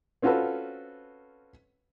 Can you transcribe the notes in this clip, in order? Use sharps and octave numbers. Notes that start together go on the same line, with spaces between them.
C4 C#4 F4 F#4 A4 B4